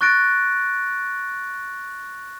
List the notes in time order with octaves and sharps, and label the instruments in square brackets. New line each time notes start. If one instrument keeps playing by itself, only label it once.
[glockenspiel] C#6 F#6 A6 A#6 D7